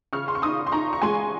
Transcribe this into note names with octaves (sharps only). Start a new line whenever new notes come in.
C#3 C#6 F6
C6
C#6
D#4 C6 D#6
C6
D#4 A#5 C#6
C#6
G#3 G#5 C6